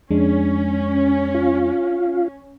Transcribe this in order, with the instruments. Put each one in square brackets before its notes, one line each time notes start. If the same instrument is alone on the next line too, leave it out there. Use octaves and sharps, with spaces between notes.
[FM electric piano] F2 G#3 D4 [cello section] C#4
[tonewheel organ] F4